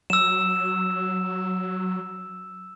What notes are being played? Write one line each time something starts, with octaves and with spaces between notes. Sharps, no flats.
F#3 E6 E7